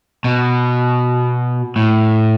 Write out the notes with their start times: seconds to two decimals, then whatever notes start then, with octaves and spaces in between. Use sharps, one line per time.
0.24 B2
1.76 A2